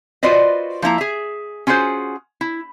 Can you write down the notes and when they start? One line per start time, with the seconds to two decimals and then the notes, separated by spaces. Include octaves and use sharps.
0.23 F4 F#4 B4 C5 D5 D#5
0.82 F3 A#3 E4 A#5
0.98 G#4 E5
1.67 C#4 F4 F#4 G#4 C5
2.41 E4